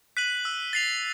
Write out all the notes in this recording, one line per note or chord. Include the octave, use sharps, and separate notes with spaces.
F#6 B6 D#7 F#7
E6
A6 C7 F7